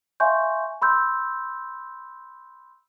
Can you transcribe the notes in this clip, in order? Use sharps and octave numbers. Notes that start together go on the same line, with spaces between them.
E5 F5 G#5 C6 C#6 G6
B5 C6 E6 G6